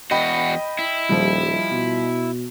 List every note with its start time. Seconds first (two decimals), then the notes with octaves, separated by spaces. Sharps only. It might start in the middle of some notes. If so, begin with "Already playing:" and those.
0.11 E2 F#4 D#5 G5 B5
0.79 E4
1.09 D#1 F3 G3
1.71 B2